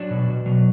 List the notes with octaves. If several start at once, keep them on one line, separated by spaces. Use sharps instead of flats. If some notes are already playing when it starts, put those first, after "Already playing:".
Already playing: F#3 D4 F#4
B2
B2
F#3